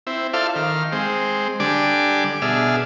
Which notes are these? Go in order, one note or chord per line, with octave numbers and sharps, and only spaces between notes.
C4 E4
F4 A4 C5 D5 E5 F5
D#3 F5
G#3 C4
D3 G3 D4 G#5 D6
B2 D4 G#4 E5 F6